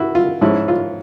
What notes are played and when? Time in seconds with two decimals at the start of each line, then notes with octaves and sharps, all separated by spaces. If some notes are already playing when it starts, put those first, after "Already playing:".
Already playing: E4 F#4
0.15 F4
0.41 G#2 F3 G#3 C#4 E4
0.68 F4